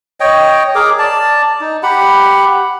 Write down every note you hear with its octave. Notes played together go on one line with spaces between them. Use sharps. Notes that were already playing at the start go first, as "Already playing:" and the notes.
C#5 D#5 G5
G#4 A#4 D6
D5 A5
D#4
G4 F#5 B5